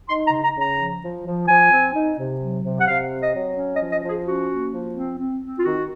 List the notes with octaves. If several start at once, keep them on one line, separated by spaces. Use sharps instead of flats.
D#4 C6
A#5
C#3
A#5
C#3
A#5
F3
F3
F3
F3 G#5
C4
D#4
C3
F#3
C3
F#5
C3 F5
C4
D#5
F#3
C#4
D#5
F3
D#5
F3
G#4
C#4 F#4
A#3
F3
C4
C4
C4
F4
D#3 F#4